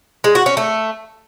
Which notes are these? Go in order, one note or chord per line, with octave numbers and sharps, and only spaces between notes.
G#3
F#4
C#4
A3